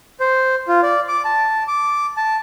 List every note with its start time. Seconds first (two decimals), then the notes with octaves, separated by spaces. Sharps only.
0.20 C5
0.68 F4
0.83 D5
1.08 D6
1.25 A5
1.68 D6
2.17 A5